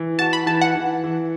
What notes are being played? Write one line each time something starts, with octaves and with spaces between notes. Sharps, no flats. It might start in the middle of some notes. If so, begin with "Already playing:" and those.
Already playing: E3
F#4 A5
B5
E3 A5
F#5
E3
E3